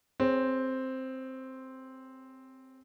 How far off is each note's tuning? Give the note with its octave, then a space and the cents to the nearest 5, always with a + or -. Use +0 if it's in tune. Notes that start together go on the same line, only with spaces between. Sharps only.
C4 +0 G#4 +0 C#5 -20